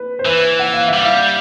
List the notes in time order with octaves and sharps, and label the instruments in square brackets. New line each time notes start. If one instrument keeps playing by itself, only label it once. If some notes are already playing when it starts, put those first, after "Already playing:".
Already playing: [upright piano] B4
C5
[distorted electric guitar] E3 [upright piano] B4
[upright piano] F#5
F5
E5
[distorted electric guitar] G3
[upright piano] F5